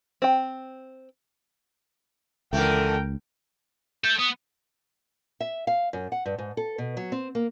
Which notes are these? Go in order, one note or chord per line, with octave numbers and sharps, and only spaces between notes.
C4 G5
C#2 D3 E3 A3 A#4 G5
A4 E5 G6
B3 D#6
E5
F5
F#2
F#5
G2
G#2
A4
B2
F#3
C4
A#3